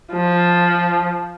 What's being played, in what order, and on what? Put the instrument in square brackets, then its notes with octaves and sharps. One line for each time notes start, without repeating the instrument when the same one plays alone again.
[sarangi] F3